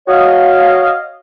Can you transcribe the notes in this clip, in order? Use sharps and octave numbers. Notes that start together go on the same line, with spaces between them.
F#4 C#5 D#5 F5